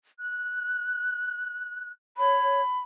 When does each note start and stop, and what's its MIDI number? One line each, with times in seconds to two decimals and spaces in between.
0.19 1.91 90
2.17 2.61 73
2.17 2.80 83